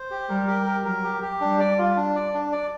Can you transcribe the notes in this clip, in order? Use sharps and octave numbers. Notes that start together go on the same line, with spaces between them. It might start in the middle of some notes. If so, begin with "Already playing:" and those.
Already playing: C5
G4
G3 A#4
G4
A#4
F#3 A#4
G4
G4
G3 D4
D5
F4
D4
D5
D4
D5